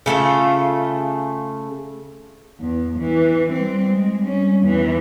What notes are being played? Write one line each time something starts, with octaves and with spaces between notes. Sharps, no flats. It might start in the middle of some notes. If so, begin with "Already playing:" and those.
C#3 A3 F4 A4
E2
E3
G3 C4
G#3
G3 C#4
E2 E3